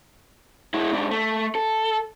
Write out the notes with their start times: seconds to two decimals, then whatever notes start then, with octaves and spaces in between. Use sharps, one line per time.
0.74 G#3 E4
0.93 G#2 D4
1.11 A3
1.55 A4